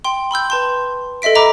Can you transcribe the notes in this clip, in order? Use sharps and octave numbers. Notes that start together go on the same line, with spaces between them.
G5 C6
B5 C6 E6 G6
B4 A5 C6
A4 D#5 E5 B6 D7
D#5 A#5 B5 D6